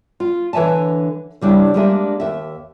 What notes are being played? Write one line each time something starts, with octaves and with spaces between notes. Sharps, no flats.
F4
D3 E3 C#5 E5 G#5 A5
C#3 G3 D4 E4
G3 G#3 A#3 D4 G#4 E5
D#2 E5